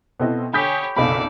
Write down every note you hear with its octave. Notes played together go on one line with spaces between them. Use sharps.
B2 B3 C4 E4 A4 D#5
D3 G4 C#5 G#5 B5 D#6 G6 B6
F#1 B1 F2 A4 D5 D#5 F5 B5